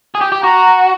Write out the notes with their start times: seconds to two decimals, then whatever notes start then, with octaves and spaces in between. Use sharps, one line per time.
0.15 G#4
0.21 G4
0.32 G4
0.43 F#4 A#5